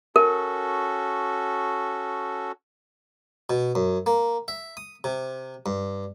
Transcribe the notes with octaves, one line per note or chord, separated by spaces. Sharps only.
C#4 F#4 A4 A#4
B2
F#2
A#3
E5
D#6
C3
G2